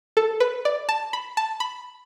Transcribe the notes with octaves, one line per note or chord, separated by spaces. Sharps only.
A4
B4
D5
A5
B5
A5
B5